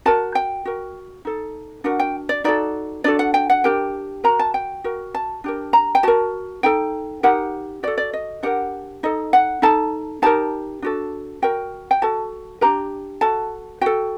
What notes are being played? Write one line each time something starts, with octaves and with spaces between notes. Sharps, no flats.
F#4 A#4 A5
G5
F#4 A#4
D#4 A4
D4 F#4 A#4 F#5
G5
D5
D#4 F#4 A4 D5
D4 F#4 A4 D5
F#5
G5
F#5
D4 G4 A#4 G5
F#4 A#4 A#5
A5
G5
F#4 A#4
A5
D4 G4 A#4
A#5
G5
F#4 A#4 A5
D#4 A4 G5
D#4 G4 A#4 F#5
F#4 A4 D5
D5
D#5
D4 G4 A#4 F#5
D#4 A4 D#5
F#5
D#4 A4 A5
D#4 G4 A#4 A5
D4 F#4 A4
F#4 A#4 G5
G5
F#4 A4 A5
D4 G4 A#4 A#5
F#4 A4 A5
F#4 A4 G5